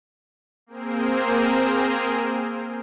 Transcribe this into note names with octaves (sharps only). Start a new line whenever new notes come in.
A#3 C4 G#4 A#4 C5